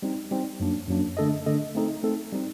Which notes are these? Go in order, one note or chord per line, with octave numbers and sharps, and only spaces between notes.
G3 C4 D#4
G3 C4 D#4
F#2 F#3 A#3 D4
F#2 F#3 A#3 D4
D3 A3 D4 A4 D#5
D3 A3 D4 A4 D#5
A3 C4 D#4 A4
A3 C4 D#4 A4
G3 C4 D#4